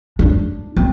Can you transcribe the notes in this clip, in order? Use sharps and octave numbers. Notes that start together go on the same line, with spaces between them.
D4
C4